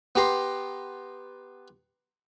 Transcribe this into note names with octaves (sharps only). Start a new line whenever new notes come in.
B3 G4 A#5 C6